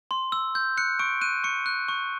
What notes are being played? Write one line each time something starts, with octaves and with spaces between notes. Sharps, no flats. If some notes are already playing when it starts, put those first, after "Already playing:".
C6
E6
G6
F#6 C#7
C#6 D7
F#6 D#7
C#6 C#7
F#6
C#6